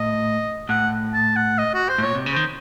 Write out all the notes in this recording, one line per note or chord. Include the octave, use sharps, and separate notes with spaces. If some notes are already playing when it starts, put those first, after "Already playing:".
Already playing: A2 D#5
A2 F#5
A5
F#5
D#5
F#4
C5
A2
A#2 C#5
C3
C#3
D#3 C5